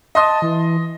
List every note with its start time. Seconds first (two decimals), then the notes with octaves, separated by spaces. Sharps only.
0.15 D#5 A5 C6 D#6
0.42 E3